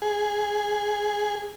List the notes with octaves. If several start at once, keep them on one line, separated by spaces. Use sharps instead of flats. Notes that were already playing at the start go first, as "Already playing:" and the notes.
G#4